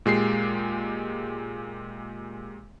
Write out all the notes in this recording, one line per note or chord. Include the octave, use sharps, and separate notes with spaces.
A#2 G#3 G4 C7